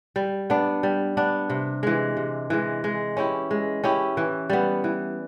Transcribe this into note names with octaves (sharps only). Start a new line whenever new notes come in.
G3
B3 D4
G3
B3 D4
C3
E3 G#3
C3
E3 G#3
G#3
C#4 E4 G4
G#3
C#4 E4 G4
E3
G3 B3
E3